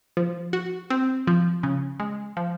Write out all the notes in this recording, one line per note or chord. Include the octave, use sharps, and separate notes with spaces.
F3
F#4
C4
F3
C#3
G#3
F3